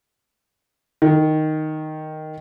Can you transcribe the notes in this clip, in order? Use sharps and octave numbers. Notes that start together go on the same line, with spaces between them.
D#3